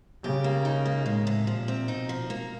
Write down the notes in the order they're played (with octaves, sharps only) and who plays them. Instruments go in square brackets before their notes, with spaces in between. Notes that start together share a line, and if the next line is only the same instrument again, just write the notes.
[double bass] C#3 [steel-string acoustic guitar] G4
[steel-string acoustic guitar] A#3
D#4
A#3
[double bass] A2 [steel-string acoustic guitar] G#3
[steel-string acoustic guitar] C3
[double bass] A#2 [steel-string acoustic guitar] F3
[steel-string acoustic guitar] C4
[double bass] B2 [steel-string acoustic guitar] D#4
[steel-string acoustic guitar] F3
A#3